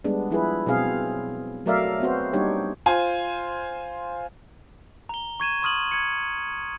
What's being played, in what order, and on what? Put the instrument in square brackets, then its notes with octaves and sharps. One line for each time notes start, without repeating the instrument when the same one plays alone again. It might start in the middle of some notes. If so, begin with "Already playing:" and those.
[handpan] G3 G#3 B3 D4
F3 E4 G#4 B4
B2 F#3 C4 G#4 F5
F#3 A3 A#4 D5 E5 F5
B3 C4 F#4 C5
G3 A#3 D4 D#4 G4 C#5
[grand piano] F4 C5 G#5
[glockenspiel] A#5 G7
C#6 G#6 D#7 E7
C6 C#6 D#6 F6 D#7 F#7
G#6 C#7